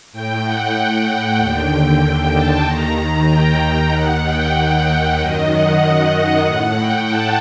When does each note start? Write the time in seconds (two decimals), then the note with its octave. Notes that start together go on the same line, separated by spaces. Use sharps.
0.13 A2 G5
0.44 F#5
1.39 D#2 D3 G5
2.35 A5
2.66 D#2 D#3 A#5
3.29 G5
3.92 D#2 D#3 F#5
4.24 G5
4.56 G5
5.19 F#2 D#3 D#5
5.51 F#5
6.14 F#5
6.45 A2
6.77 G5
7.09 A5